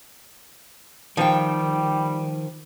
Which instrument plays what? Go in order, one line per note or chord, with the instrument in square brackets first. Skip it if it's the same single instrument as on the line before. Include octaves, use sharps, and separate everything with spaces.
[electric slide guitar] D#3 [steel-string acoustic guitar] F3 G5 [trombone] G3